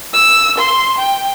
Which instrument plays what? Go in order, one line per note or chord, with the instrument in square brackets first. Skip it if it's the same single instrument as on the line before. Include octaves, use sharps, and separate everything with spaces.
[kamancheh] E6
C6
G5